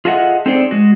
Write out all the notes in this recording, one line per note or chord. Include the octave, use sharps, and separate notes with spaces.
F4 G#4 A4 D#5 E5 F#5
C4 D#4 G#4 A4 C5 D5
G#3 F#4